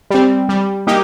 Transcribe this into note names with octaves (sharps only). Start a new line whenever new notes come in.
G3 C4
G3
A#3 D#4 G4